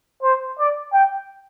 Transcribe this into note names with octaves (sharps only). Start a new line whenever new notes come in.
C5
D5
G5